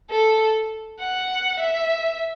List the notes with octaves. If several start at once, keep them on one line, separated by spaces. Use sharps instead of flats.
A4
F#5
E5